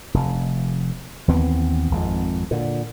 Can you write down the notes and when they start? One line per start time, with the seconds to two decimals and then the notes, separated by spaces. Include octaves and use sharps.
0.14 F1
1.28 D#2 E3 B3 C4
1.91 G#1 F2
2.51 A#2 D3